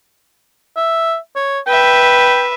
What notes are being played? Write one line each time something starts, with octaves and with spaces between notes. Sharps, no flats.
E5
C#5
B4 E5 G5